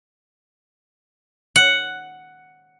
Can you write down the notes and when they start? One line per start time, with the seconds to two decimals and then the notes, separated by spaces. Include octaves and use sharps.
1.56 F#5